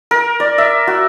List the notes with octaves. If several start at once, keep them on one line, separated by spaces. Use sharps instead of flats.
A#4
D5
E5
F#4